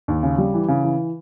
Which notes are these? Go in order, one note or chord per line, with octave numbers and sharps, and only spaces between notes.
D#2
C#3
G3
E3
C#3
E3